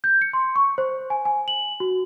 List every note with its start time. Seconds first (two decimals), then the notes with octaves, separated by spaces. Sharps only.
0.04 G6
0.22 C#7
0.33 C6
0.56 C#6
0.78 C5
1.10 G#5
1.25 G#5
1.48 F#7
1.80 F#4